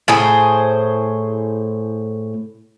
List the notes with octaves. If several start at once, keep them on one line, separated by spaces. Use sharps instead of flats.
A2 G#4 C5